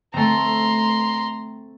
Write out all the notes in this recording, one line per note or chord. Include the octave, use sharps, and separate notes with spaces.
A3 C4 A#5 C6